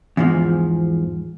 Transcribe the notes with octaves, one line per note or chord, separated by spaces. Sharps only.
E2 G#2 F3